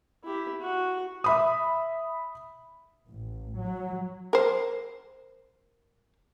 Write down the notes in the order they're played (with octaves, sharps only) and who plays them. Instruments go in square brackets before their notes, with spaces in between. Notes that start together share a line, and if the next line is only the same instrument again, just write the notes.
[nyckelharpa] E4 G4
F#4
[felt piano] E5 B5 D#6
[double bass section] A1
F#3
[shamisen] A#4 C5